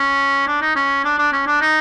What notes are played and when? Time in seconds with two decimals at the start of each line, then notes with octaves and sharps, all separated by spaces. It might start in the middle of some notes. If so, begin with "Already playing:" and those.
Already playing: C#4
0.47 D4
0.61 D#4
0.76 C#4
1.04 D4
1.18 D4
1.32 C#4
1.47 D4
1.61 D#4